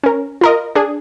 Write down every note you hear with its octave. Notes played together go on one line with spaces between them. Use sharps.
C#4 A#4
F4 A#4 D#5
D4 G#4